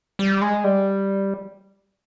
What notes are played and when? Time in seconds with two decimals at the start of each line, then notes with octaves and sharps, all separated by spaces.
0.19 G3
0.41 G#3
0.64 G3